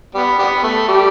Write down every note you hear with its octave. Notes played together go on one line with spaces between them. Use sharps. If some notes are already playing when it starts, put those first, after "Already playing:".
G3 B3
G3 B3
A3
G3